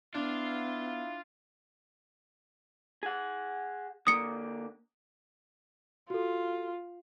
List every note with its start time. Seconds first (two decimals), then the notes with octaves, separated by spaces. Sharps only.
0.14 B3 D4 E4 F4
3.03 G#4 F#5
4.07 D3 A#3 D#6 C#7
6.10 F4 F#4 A4